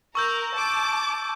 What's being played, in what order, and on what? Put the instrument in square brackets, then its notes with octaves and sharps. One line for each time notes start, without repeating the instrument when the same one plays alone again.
[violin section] A#4 [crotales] C#6 E6 G6
[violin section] A5 D6